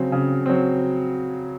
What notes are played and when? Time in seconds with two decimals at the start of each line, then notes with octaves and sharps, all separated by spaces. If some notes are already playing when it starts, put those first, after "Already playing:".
Already playing: C#3 F#3 C4
0.12 C#3
0.46 F#3 C4